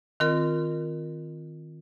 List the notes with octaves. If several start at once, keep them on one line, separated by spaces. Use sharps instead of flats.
D#3 C4 F4 A#4